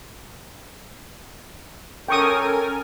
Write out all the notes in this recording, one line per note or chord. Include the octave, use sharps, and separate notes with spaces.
C#4 A4 A#4 G5 G#5 C#6 D#6